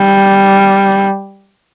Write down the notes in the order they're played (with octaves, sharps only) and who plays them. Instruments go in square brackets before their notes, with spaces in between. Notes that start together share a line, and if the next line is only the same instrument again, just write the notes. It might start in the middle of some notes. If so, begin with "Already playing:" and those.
Already playing: [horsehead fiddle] G3